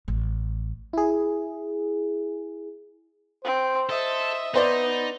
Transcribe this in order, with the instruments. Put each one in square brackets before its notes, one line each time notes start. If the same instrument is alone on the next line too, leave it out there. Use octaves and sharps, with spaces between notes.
[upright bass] A1
[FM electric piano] E4 G#4
[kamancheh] C4 [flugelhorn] C5
[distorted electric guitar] A4 [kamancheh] D#5 E5
[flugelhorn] B3 [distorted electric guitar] D#4 [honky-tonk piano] B4 C5 D5